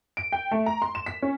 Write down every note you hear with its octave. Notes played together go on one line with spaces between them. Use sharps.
D7
G5
A3
A#5
C6
E7
B6
C#4